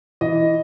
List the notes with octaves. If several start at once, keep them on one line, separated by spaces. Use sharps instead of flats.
E3 D#5